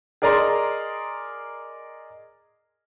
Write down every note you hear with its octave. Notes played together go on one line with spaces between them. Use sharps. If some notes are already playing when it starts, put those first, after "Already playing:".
G#4 A#4 D5 D#5 A#5 C6